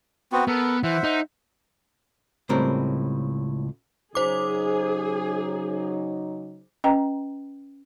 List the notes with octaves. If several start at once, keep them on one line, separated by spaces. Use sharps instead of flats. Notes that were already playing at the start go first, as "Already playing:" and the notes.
B3 C4 F#4
B3 A4 A#4
E3 C5 E5 F#5
D#4
C#2 A2 G3 C4 A#4
C#3 F#3 D#4 G#4 C5 D6
C#4 B4 D#5 G5 A#5